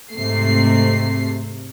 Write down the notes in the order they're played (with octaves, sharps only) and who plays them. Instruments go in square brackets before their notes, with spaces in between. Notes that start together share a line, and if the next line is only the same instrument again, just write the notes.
[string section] G#2 C3 A3 C7